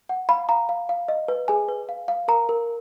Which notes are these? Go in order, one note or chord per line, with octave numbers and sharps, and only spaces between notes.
F#5
F5 B5
F5 A#5
F5
F5
D#5
B4
G#4 G#5
B4
F5
F5
A#4 A#5
A#4